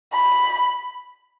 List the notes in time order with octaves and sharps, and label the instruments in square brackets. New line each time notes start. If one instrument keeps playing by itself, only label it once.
[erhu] B5